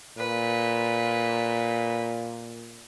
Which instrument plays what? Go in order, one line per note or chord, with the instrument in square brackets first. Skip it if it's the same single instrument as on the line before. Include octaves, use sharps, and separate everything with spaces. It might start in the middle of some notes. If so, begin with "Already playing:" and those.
[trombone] A#2 [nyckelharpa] B4